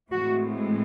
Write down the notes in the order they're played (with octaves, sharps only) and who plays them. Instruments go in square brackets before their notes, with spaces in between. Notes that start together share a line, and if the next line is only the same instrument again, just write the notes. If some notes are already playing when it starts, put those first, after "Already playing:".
[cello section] A2 E3 G#3 C4 F#4